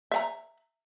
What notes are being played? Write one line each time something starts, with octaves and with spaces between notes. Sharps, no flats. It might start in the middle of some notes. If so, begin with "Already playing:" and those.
E5 F5 A#5